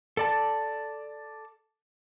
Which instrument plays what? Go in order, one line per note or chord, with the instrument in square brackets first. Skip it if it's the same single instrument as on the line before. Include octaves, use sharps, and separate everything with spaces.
[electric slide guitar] A4 D5 A5